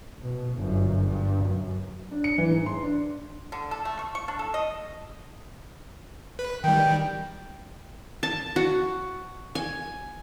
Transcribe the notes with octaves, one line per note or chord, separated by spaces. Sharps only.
B2
G1 F#2
G2
F#2
D4
C#7
E3
G#2
C6
D4
D3
A4
A3
C#6
C#6
D4
A4
D#5
B4
D#3 G3 G5
A5
F#4
G#5